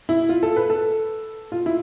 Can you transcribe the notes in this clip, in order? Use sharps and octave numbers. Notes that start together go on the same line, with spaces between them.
E4
F4
A4
B4
A4
F4
E4